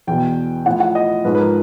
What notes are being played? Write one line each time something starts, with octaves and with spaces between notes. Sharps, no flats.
E2 B2 G5
A2 F3 F#5
F#5
D#5
G#2 F3 B4
B4
A#4